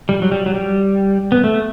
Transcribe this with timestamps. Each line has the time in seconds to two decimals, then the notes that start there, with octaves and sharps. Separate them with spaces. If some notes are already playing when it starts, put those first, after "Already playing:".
0.09 G3
0.22 F#3
0.32 G3
0.46 F#3
0.54 G3
1.32 B3
1.44 A3